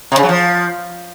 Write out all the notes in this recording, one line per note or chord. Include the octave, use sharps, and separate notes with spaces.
C3
C#3
F#3
F3